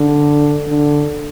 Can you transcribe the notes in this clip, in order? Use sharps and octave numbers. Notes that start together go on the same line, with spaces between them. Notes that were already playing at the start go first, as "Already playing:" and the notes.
Already playing: D3
D3